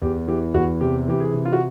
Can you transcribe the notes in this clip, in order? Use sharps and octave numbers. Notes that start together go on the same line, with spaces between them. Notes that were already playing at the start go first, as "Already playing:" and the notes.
E2 G4
E3 G4
E2 F#4
C3 G4
E3 G4
G#4
C3
F4
F#4